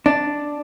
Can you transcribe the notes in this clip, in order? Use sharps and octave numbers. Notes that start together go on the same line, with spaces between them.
D4